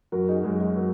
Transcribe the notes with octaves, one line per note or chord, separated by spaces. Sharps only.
F#2 F#4 A#4
D#4 G#4
F#2 G#3
G#3
F#3 A#3